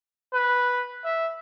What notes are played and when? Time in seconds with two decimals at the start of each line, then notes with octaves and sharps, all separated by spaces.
0.34 B4
1.05 E5